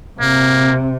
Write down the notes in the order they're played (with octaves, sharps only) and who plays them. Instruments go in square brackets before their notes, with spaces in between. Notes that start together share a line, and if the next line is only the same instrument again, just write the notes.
[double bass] C3 [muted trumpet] A#3